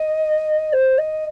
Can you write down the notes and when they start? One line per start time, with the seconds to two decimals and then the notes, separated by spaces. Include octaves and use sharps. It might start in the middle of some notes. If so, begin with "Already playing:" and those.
Already playing: D#5
0.73 C5
0.98 D#5